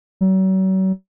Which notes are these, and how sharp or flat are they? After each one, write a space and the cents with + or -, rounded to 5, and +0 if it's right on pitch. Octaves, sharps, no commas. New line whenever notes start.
F#3 +40